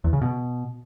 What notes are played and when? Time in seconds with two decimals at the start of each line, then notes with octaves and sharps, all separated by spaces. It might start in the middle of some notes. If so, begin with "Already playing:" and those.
0.04 E2
0.13 C#3
0.21 B2